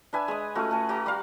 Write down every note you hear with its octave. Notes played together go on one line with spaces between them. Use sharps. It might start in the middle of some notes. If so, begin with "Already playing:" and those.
D4 B4 E5 G#5
G#3 D#6
A3 C#4 F4 F#4
A3 G#5
F#4 G4 A#5
G3 F5